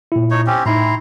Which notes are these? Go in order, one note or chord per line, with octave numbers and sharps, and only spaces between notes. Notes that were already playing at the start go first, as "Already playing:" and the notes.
A#2 E4
D#4 C#5
C4 C#4 G4
A2 D#4 E4 A#5 C6